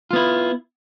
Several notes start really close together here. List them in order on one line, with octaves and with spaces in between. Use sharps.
F4 B3 E4